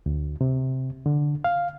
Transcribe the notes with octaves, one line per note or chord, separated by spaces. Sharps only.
D2
C3
D3
F5